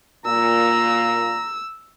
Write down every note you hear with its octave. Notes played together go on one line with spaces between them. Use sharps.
A#2 A#5 E6